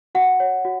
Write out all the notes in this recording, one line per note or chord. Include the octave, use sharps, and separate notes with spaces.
F#4 F#5
C#5
F#4